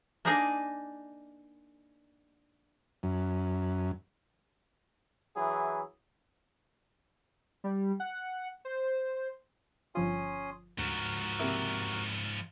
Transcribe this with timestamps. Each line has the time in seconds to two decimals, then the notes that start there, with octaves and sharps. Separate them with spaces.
0.25 A#3 D4 D#4 G#4 A#4
3.03 F#2
5.36 E3 F#3 E4 G#4
7.64 G3
8.00 F#5
8.65 C5
9.95 G1 F3 C#4 F4 C6 D#6
10.78 D2 G#2 F3 F#4 A#4 D#7
11.39 C3 A#3 E4